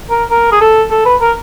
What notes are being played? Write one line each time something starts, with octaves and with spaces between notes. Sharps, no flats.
A#4
A#4
G#4
A4
A4
B4
A#4